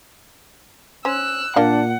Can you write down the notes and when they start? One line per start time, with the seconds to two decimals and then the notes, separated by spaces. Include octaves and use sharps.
1.05 C#4 C5 E6 F#6
1.56 A#2 A#3 D4 F5 F#5